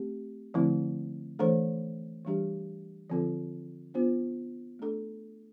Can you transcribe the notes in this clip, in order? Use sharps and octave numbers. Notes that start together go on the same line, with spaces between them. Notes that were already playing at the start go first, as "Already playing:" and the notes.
Already playing: A3 C4 G4
D3 F3 A3 C4 E4
E3 A3 D4 A4 C5
E3 G3 D4 G4
D3 F3 C4 F4 A4
B3 D4 F4 C5
A3 D4 A4